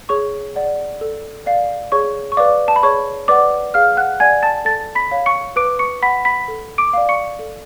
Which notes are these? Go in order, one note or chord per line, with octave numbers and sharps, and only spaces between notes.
G#4 C#5 C#6
D5 F#5
A4
D5 F5
G#4 C#5 C#6
C#6
B4 D5 F5 D6
A5
B5
G#4 C#5 C#6
B4 D5 F#5 D6
G#4 F5 F6
F#5 F#6
D5 F#5 G#5 G#6
A5 A6
A4 A5 A6
B5 B6
C#5 F5
C#6 C#7
B4 D6 D7
C#6 C#7
F#5 B5 B6
B5 B6
A4
D6 D7
D5 F5
C#6 C#7
A4